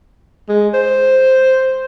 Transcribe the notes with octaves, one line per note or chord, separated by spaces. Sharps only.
G#3
C5